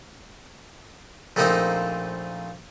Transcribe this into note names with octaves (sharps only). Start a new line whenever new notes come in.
A#1 A3 A#3 C4 D#4 D#5